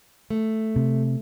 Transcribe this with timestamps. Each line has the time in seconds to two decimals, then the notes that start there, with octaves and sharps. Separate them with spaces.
0.30 A3
0.76 C3